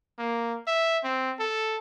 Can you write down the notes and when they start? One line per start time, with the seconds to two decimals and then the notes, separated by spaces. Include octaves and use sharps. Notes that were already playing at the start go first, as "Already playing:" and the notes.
0.19 A#3
0.67 E5
1.04 C4
1.40 A4